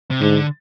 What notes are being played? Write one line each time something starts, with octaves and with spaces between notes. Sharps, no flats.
C3
G#2 D3